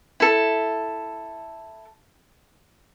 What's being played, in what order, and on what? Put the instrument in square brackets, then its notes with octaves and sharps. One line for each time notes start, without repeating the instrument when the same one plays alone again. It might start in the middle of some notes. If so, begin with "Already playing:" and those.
[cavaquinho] E4 A4